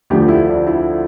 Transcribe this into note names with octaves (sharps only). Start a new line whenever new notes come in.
D2 D3 F3 G4
E4
D4
E4